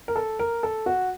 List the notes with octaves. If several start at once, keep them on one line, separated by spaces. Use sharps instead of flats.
A#4
A4
A#4
A4
F#4